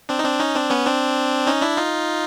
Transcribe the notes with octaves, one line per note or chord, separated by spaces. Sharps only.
C4 D4
D#4
C4 D4
C#4 D#4
C4 D4
B3 C#4
C4 D4
C#4 D#4
D4 E4
D#4 F4